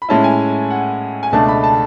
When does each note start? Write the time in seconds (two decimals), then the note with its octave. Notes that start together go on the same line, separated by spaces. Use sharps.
0.02 B5
0.09 A2 G#3 C#4 E4 A5
0.24 G#5
0.70 F#5
1.23 G#5
1.32 C#2 B2 A3 D4 A5
1.48 B5
1.64 A5